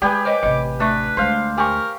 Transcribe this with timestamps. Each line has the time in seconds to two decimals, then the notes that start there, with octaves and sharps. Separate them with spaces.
0.02 G#3 G4 G#4 B4 D5 G5 G#5
0.25 C5 C#5 D#5 D6
0.43 A1 C3 D#5
0.80 A3 D4 B4 E5 C#6
1.17 D2 G#3 C5 F5
1.58 G4 A#4 G#5 C#6